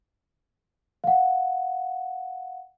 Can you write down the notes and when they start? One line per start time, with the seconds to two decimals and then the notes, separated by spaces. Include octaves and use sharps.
1.04 F5 F#5